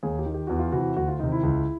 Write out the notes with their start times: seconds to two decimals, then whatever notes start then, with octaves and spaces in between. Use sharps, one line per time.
0.03 D#2 G#4
0.19 G4
0.26 D#3
0.34 G4
0.47 E2 F#4
0.59 F4
0.72 C3 E3 F#4
0.96 D2 F#4
1.08 F4
1.19 C3 D#3 D#4
1.32 E4
1.43 C#2